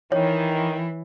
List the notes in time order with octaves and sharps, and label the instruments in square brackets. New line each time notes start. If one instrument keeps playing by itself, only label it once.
[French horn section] D#3 [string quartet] E3 [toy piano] C#5